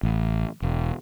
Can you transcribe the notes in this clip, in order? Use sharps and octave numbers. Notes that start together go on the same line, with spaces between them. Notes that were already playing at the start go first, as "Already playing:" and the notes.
A1
E1